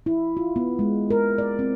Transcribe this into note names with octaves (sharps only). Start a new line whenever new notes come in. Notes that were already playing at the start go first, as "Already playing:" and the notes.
E4
F4
B3
G#3
A#4
D5
C4